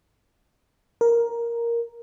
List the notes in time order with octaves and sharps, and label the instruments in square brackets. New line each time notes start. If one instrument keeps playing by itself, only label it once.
[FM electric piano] A#4